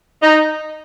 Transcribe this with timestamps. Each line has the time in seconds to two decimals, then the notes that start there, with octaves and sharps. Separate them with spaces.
0.23 D#4